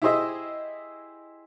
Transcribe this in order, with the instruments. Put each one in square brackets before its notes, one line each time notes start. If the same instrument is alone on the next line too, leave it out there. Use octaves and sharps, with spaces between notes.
[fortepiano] E4 G4 G#4 C5 D#5 E5